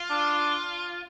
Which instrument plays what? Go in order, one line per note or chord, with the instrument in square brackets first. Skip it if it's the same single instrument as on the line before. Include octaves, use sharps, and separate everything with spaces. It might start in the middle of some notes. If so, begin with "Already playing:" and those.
Already playing: [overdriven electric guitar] F4
[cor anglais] D4